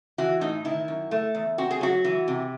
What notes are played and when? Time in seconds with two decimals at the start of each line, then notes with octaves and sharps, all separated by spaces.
0.18 E3 F#4
0.41 A2 D#4
0.65 D#3 E4
0.88 F#2
1.11 A3
1.35 E2
1.58 C4 F#4
1.71 G#4
1.81 F#3 F#4
2.04 E3
2.28 C3